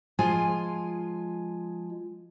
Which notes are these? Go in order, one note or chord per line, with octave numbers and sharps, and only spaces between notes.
F3 G#3 F4 G#5